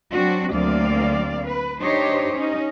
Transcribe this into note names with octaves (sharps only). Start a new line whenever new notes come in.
F#3 C4 D4 F#4
D2 F#3 A#3 C4 D5 F5
B4
D4 D#4 G4 C5 C#5
C#4 D#4